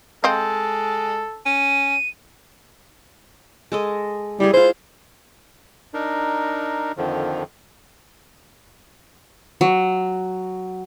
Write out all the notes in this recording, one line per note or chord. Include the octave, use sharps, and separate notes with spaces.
G#3 C4 A4 D#5 F5
C#4 D#7
G#3 A4 D#5
G3 E4 G#4
G#3 F4 C5
D4 D#4 A#4
F2 D3 D#3 F3
F#3